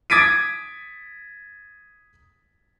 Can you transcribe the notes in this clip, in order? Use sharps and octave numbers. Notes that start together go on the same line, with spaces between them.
D#6 G#6 A6 B6 D7 D#7